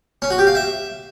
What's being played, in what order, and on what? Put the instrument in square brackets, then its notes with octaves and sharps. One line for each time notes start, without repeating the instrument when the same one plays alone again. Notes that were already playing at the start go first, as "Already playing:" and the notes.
[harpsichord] C#4
F#4
G4
F5
E5